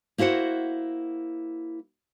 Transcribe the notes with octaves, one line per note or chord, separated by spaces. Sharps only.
A#3 E4 F#4 C5 F#5